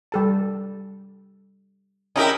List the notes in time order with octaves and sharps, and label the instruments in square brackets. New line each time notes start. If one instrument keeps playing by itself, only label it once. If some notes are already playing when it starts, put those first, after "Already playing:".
[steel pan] G3 A4 A5
[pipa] C#4 G#4 A#4 [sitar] D#4 E4 G4